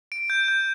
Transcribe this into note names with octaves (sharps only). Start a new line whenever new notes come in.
D7
G6
G6